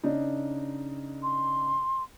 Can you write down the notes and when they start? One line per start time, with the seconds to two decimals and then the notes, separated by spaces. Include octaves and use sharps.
0.04 C#3 D4 D#4
1.23 C6